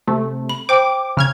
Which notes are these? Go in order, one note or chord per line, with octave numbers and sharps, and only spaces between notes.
C3 A3
B5
C5 G5 D6
C#3 F6 G#6